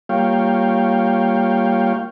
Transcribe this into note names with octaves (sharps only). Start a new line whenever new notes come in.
G3 A#3 F4 C#5 F5 G5